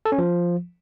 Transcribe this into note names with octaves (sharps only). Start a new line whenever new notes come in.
A4
C#4
F3